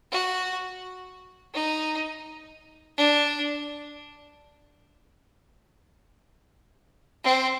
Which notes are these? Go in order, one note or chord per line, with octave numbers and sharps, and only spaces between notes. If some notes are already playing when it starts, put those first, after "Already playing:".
F#4
D#4
D4
C4